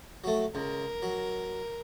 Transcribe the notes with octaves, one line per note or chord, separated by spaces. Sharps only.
F#3 A3
C#2 A#4
F#3